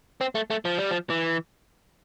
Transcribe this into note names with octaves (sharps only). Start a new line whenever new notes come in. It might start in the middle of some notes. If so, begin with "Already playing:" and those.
C4
A3
A3
F3
G3
F3
E3